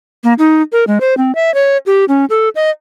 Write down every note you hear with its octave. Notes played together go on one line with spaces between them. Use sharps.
A#3
D#4
A#4
G#3
C5
C4
E5
C#5
G4
C#4
A4
D#5